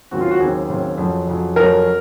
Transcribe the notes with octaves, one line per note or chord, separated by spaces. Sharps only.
D#2 C#3 F#3 C4 F#4
F4
F#4
D#2 C#3 F#3 C4 G#4
D#2 C#3 F#3 C4
F2 C#3 F#3
F2 C#3 F#3
F2 C#3 F#3 A#4